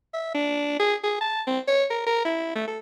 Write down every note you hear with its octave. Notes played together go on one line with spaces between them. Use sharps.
E5
D4
G#4
G#4
A5
C4
C#5
A#4
A#4
E4
A3
A4